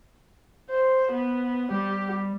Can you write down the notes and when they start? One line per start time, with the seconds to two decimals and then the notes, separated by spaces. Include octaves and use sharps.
0.70 C5
1.12 B3
1.71 G3 G4